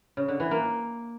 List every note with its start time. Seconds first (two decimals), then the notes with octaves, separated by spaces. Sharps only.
0.17 C#3
0.28 D3
0.40 E3
0.51 A#3